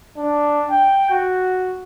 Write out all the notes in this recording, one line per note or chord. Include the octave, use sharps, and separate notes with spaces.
D4
G5
F#4